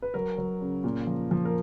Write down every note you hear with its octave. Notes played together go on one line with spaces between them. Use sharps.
B4
F#3 A#4
F#3
C#3
A#2
F3
F3
A#4